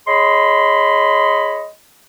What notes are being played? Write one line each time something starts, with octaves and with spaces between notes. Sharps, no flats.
G#4 C#5 D#5 B5 C6